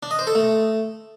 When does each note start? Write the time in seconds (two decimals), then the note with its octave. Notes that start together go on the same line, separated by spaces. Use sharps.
0.03 D4
0.11 D#5
0.19 C5
0.27 A4
0.35 A3